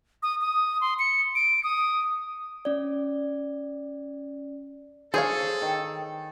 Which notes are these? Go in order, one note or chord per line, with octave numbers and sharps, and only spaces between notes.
D#6
D#6
C6
C#7
D7
D#6
C#4 D5
G#4 A4 C5 C#5 F5
D#3